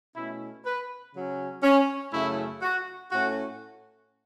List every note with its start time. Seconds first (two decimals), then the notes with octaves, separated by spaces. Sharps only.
0.16 B2 A3 C#4 E4
0.65 B4
1.14 C#3 F#3 C#4
1.63 C#4
2.13 F#2 C#3 A3 C#4 E4
2.62 F#4
3.11 A2 A3 C#4 F#4